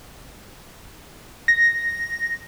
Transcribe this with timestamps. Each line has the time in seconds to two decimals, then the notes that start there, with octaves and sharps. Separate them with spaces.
1.48 A#6